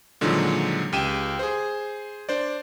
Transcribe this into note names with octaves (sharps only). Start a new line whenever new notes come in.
A#2 D3 D#3 F3 F#3 G#3
C#2 G4 G5 D#7 E7
G#4 C5
D4 C5 D5